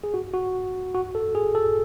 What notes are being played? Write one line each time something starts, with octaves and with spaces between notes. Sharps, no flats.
G#4
F#4
F#4
F#4
A4
G#4
A4